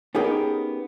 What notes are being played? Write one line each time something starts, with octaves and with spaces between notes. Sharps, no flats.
B3 C#4 D#4 G4 G#4 A#4